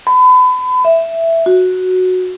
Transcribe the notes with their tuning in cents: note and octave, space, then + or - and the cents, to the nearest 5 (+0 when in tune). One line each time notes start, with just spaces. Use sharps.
B5 +35
E5 +5
F#4 -5